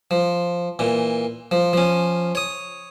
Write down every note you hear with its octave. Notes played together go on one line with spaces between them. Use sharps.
F3
A#2 E3
F3
F3 C#4
C#5 D#6